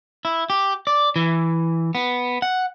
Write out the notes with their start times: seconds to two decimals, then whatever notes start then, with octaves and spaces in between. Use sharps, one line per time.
0.25 E4
0.50 G4
0.87 D5
1.16 E3
1.95 B3
2.42 F#5